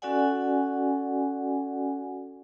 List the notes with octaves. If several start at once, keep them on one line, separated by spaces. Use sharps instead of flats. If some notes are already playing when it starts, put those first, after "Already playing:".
C#4 F#4 A4 D5 F#5 G#5